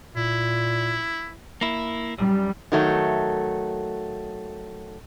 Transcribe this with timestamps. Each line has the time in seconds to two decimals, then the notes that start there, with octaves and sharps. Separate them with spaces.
0.16 A#2 E4
1.61 A#3 E4
2.18 F#2 G3
2.72 D#3 F#3 A3